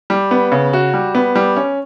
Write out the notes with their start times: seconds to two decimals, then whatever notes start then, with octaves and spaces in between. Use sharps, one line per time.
0.10 G3
0.31 B3
0.52 C#3
0.73 F#4
0.93 G3
1.15 B3
1.35 G3
1.56 C#4